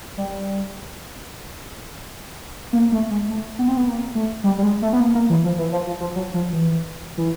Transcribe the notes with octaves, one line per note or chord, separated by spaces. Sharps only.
G3
A#3
A3
G#3
A3
B3
C4
B3
A#3
A3
G3
G3
G#3
A3
B3
A#3
A#3
E3
F3
E3
F3
F3
F3
F#3
F3
E3
E3